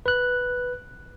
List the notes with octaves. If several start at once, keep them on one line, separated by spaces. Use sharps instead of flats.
B4 F#6